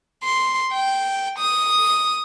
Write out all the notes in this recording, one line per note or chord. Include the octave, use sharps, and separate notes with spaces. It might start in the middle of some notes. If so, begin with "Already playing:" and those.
C6
G5
D#6